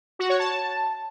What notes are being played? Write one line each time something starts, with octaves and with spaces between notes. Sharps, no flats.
F#4
C#5
A5